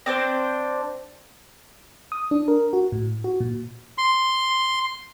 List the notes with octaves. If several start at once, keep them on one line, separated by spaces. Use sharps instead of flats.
C4 D4 C5
D#6
D4
A#4
F#4
A2
F#4
A#2
C6